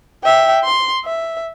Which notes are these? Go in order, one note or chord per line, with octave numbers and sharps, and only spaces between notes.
E5 G5
C6
E5